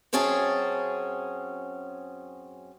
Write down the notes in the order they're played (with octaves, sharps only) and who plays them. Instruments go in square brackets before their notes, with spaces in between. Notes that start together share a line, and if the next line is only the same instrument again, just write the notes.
[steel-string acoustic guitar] F#2 C4 C#4 G#4 A5